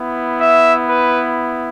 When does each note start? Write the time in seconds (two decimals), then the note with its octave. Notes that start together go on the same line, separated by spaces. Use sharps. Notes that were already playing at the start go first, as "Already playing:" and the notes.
Already playing: B3 E4
0.38 E5
0.88 B4